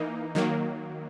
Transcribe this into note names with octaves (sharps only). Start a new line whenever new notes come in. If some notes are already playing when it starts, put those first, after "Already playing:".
Already playing: E3 A#3 D#4
D#3 F#3 A#3